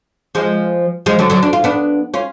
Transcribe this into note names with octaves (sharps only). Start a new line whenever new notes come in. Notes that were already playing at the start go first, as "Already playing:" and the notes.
F3 G#3
F3 G#3
D3 F#3
D3 F#3
D4
F4
B3 D4
C#4 F4